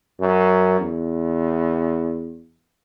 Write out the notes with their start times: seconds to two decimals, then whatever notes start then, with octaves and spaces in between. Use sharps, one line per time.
0.21 F#2
0.80 E2